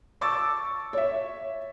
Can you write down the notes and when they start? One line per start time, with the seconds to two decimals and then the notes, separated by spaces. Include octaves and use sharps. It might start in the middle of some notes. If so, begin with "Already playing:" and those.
0.21 A5 C#6 D6 E6 A6
0.93 C#5 E5